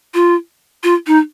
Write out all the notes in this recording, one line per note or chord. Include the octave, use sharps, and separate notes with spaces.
F4
F4
D#4